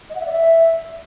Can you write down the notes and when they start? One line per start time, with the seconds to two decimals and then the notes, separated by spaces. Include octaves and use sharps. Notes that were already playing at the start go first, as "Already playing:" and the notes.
0.10 D#5
0.15 F#5
0.21 E5
0.26 D5
0.31 E5